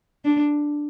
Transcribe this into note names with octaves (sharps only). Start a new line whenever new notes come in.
D4